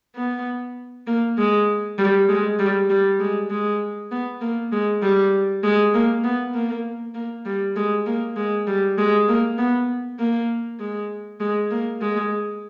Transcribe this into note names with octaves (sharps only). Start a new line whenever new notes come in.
B3
A#3
G#3
G3
G#3
G3
G3
G#3
G#3
B3
A#3
G#3
G3
G#3
A#3
B3
A#3
A#3
G3
G#3
A#3
G#3
G3
G#3
A#3
B3
A#3
G#3
G#3
A#3
G#3